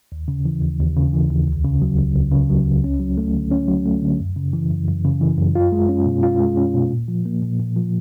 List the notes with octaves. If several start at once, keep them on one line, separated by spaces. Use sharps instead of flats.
D#2
C#3
E3
D#2
D#2
C#3
E3
D#2
C#2
C#3
F#3
C#2
C#2
C#3
F#3
C#2
C#4
F#3
A3
D3
C#4
F#3
A3
D3
F#2
C#3
E3
F#2
F#2
C#3
E3
F#2
F4
G#3
C#4
B2
F4
G#3
C#4
B2
A#2
F3
A#3
A#2
A#2
F3